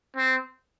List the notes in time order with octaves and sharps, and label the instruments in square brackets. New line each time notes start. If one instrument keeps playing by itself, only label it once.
[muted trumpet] C4